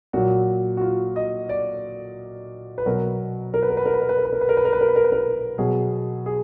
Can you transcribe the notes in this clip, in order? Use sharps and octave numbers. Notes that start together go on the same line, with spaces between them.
A#2 F#3 F#4
F#4
F4
D#5
D5
B4
B2 F#3 A#4
A#4
B4
A#4
B4
A#4
B4
A#4
B4
A#4
B4
A#4
B4
A#4
B4
A#4
B4
A#4
B4
A#4
B4
A#4
B2 F#3 G#4
G#4